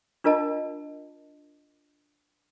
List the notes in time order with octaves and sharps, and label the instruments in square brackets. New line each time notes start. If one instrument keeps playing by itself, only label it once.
[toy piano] D4 F4 A#4 D#5 A5